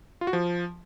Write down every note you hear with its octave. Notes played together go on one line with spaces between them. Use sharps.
F4
F#4
F3